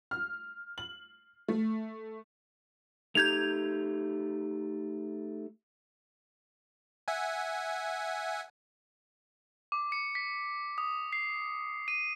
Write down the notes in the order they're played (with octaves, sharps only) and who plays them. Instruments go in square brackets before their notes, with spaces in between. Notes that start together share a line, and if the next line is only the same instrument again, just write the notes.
[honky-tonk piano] F6
F#7
A3
[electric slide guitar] A3 D#4 G4 [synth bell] G6 G#6 F7
[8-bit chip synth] E5 F#5 G#5
[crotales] D6
C#7
B6
D#6
C7
D#7